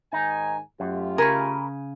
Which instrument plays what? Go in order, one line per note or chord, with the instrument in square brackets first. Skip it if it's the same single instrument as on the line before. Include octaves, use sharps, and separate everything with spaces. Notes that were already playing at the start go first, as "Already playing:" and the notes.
[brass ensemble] G#2 D#3 G#5 [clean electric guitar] D#4
[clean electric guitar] F#2 [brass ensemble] A3 F4 G4
[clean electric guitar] C#3 G#5 [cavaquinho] A#4 B5 C#6